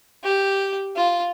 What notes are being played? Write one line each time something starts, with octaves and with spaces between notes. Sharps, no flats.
G4
F4